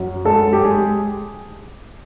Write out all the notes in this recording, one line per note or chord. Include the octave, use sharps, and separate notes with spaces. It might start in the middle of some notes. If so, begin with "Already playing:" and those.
Already playing: F#2
G#3 A4
G4
G#3 G#4